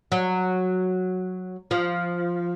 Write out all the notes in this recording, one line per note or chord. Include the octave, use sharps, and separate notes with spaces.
F#3
F3